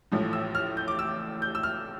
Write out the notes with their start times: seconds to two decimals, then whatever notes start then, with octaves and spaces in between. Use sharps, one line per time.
0.12 A1 A2 F3
0.33 E6
0.55 F6
0.77 G6
0.88 D6
0.99 E6
1.42 G6
1.55 E6
1.63 F6